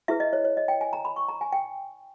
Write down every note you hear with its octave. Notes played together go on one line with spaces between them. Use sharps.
E4 G#4 B4 E5
D#5
C#5
C#5
D#5
G5
G#5
A#5
B5
C#6
A#5
G#5
G5